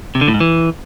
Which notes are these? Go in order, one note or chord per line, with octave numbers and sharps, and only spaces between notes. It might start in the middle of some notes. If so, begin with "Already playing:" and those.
C3
D3
A2
G#2
E3